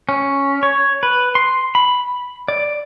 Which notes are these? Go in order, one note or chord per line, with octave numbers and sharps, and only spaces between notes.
C#4
C#5
B4
C6
B5
D5